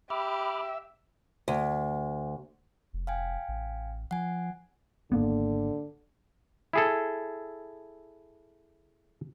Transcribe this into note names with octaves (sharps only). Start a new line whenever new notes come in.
G4 E5 B5 D6 F6
D2
F1
F5 G5 G#5
A1
F3 F#5 G#5
G#1 D3 A#3 B3
E4 G#4 A4